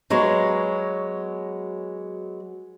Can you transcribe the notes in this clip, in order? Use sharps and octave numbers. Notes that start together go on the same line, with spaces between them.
F#3 G#3 B3 C#5